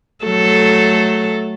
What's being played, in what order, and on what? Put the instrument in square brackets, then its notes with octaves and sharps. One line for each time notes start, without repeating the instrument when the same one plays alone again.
[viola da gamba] F#3 A3 A4